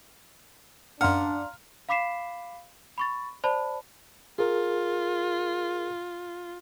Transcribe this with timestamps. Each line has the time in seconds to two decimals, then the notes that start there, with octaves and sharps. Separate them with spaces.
1.01 F#2 D4 F5 F#5 A#5 C6 F6
1.89 F5 B5 D6 B6 C7 E7
2.98 B5 C#6 A6
3.44 C5 D5 A5 B5
4.38 F4 G#4 A#4